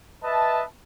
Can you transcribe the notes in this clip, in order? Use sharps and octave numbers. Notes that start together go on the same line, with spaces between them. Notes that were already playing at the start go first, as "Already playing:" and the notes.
B4 D#5 E5 A5